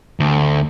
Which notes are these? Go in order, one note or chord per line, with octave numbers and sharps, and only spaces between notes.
D2